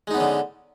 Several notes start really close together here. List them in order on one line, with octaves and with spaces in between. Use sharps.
G#3 D#4 B3 C#4 D3